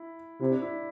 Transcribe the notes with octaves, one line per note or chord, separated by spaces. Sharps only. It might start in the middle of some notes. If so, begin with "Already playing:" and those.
Already playing: E4
C3 E4
D4
E4